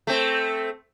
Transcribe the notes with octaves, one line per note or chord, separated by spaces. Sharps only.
A3 C4